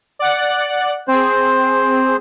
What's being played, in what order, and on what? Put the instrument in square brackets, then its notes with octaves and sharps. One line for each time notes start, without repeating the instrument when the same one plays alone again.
[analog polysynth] D5 F#5 F#6
[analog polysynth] C4 G#4 [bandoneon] C5